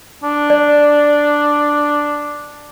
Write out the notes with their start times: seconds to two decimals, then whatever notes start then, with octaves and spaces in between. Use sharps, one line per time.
0.24 D4
0.50 D5